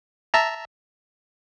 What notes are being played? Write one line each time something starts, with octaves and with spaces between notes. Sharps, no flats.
E5 A5 A#5